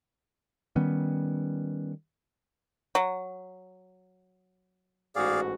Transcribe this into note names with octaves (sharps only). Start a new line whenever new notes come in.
D#3 G3 B3 C#4
F#3
A1 G#2 F#4 G#4 D5 F5